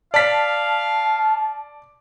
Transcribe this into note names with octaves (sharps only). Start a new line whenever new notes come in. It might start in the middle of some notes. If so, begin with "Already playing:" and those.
D5 F5 A5 B6